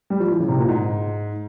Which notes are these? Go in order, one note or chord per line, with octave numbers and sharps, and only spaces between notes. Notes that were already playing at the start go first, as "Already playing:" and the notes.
G3
F3
E3
C#3
C3
A#2
G#2